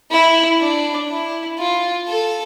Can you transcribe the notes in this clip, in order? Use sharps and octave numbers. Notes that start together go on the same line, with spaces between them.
E4
D4
E4
F4
A4